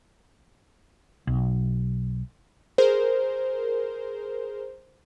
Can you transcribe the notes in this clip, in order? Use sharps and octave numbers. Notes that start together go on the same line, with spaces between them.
B1
G#4 A#4 C5